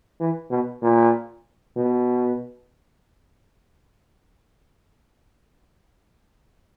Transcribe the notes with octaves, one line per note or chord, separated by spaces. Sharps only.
E3
B2
A#2
B2